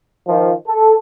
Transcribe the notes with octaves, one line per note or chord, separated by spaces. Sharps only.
D#3 F3
A4